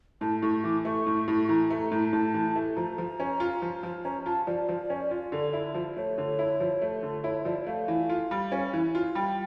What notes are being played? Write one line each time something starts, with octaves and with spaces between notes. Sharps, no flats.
A2 A5
A2 C#6
E3 D6
A3 C#6
A2
A2
C#6
E3 A#5
A3
A#5
A2
A2 A5
E3
A3
F3 A#5
F3
C#4
F4
F3
F3
C#4 A#5
F4 A5
F3 D5
F3
C#4
F4
D3
E4
F3
A3 C#5
D3
E4
F3
A3
D3
E4 C#5
F3 D5
A3 F5
E3
F4
G3
C#4
E3
F4
G3 G5